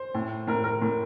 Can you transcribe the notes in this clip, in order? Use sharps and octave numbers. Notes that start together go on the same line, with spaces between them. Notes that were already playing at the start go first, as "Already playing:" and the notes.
Already playing: C5
A2
A2 A#4
A#4
A2